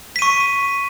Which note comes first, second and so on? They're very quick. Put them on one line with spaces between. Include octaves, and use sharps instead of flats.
B6 D#7 C#6